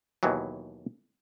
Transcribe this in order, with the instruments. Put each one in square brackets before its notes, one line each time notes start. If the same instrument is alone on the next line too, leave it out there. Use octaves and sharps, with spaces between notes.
[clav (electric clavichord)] D#2 B2 E3 F#3